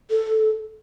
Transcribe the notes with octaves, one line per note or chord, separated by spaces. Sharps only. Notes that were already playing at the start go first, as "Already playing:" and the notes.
A4